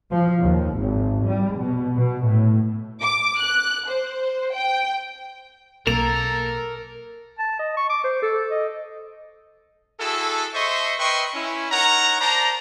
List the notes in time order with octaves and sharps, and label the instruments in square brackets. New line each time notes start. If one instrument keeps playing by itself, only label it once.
[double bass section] F3
D#2
G#1
G3
B2
B2
A2
[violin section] D6
F#6
C5
G5
[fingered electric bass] B1 [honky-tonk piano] A#3 F7 [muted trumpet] A4 [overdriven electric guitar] A#4
[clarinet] A5
D#5
C#6
D6
C5
A4
D#5
[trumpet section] E4 F#4 G#4 A4
C5 D#5 E5 C6 C#6
B4 D#5 E5 G5 C6 C#6
C#4 E4
D#4 A#4 C#5 F#5 A#5
C5 D5 A5 A#5